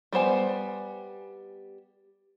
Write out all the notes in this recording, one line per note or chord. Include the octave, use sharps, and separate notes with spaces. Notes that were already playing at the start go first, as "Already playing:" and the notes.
G3 B3 C5 G#5